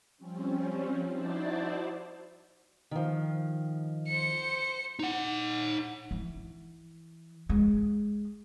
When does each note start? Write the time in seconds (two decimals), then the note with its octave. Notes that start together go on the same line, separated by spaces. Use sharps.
0.17 F3 G3 C4 C#4
1.09 D#4 E4 F#4 C5 D5 A5
2.91 D#3 F3
4.07 C5 C#7
4.99 D#4 F#5
6.11 E3
7.49 G#3